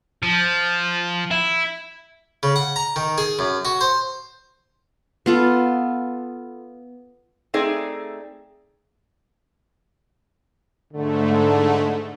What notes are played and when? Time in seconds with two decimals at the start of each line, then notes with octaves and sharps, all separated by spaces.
0.23 F3
1.31 E4
2.43 C#3
2.56 F#5
2.76 A#5
2.96 D#3
3.18 G#4
3.39 F#2
3.65 F#4
3.81 C5
5.26 B3 F4 A4
7.54 A3 C4 D#4 G#4 D5
10.93 G#2 D3 A3